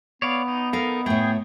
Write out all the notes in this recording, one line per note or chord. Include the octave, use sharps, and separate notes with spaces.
B3 C#5 D5 F5
D#4
D#4 A4 A#4 F5
A2 A3 G#4 G5